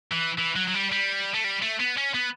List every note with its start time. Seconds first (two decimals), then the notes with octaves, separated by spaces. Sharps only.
0.12 E3
0.39 E3
0.56 F#3
0.68 F#3
0.74 G3
0.92 G3
1.34 A3
1.44 G3
1.62 A3
1.80 B3
1.98 C#4
2.14 B3